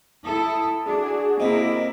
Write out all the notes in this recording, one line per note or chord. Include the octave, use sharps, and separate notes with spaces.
E4 A4 D#6
D4 F#4 G#4
C3 A#3 E4 D#5